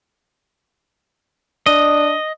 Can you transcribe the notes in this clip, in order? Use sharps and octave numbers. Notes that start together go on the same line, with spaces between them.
D4 D#5